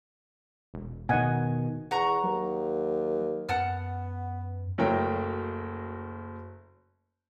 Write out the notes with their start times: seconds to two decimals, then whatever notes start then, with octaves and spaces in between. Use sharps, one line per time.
0.74 E1
1.09 B2 D#3 D#5 F#5 G#5
1.91 E2 F#5 A#5 C#6
2.23 D#2 F#3
3.49 F#2 B3 F#5 A5 F6
4.78 F#1 F#3 A3 A#4 G5